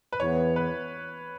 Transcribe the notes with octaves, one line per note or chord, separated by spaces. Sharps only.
B4
E2 E3 B3 C#5
B4